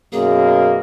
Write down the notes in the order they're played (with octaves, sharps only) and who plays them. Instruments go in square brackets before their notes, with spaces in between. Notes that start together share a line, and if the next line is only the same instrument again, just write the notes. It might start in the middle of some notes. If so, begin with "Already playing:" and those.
[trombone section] F#2 B2 A#3 [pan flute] G#4